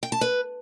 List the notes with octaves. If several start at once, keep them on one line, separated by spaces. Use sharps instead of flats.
G5
A5
B4